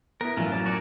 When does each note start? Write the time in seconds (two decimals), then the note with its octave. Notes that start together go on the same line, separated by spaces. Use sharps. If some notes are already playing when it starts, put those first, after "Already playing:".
0.21 B3 E4 A#4
0.37 A1 F#2 E3 F4
0.52 F#3 A#3 A5
0.66 F#4 C#5 D5